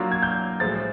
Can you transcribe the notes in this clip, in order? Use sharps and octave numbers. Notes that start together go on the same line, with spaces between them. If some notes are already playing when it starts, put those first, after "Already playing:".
Already playing: F#3 A#3 D4 F4
G#6
G6
A2 F3 G#3 A6